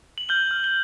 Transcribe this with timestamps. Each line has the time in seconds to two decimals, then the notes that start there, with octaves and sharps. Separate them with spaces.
0.18 F#7
0.29 F6 G6 G7
0.51 F6
0.64 G7